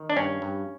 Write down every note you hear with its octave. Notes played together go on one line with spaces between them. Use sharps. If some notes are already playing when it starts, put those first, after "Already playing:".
Already playing: D#3
D4
G2 C#4
G2